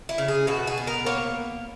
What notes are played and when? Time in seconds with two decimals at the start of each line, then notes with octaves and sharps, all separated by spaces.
0.09 E4
0.18 C#3
0.28 G#4
0.47 B2 F#4
0.67 G#4
0.78 B3
0.87 A#4
1.06 A#3 C#5